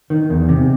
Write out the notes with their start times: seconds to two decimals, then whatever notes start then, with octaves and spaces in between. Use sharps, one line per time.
0.10 D#3
0.30 E2
0.49 C3